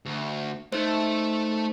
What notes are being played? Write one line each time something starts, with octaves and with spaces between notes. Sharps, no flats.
D2
A3 D#4 A4 C5